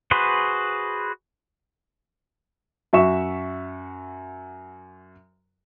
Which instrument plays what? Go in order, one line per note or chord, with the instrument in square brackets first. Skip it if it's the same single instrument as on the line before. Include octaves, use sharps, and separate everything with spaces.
[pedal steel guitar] F#4 G#4 B4 C5
[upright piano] F#2 F#4 E5 C#6 E7